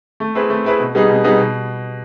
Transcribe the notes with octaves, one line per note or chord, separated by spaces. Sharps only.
A3
C4 E4 G#4 B4
A3
C4 E4 G#4 B4
B2
G3 B3 D#4 G#4
B2
G3 B3 D#4 G#4
B2